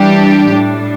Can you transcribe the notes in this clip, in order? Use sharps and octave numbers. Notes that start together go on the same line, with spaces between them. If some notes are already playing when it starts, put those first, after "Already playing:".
Already playing: E3 G3 D4 G4
A2 G3 D4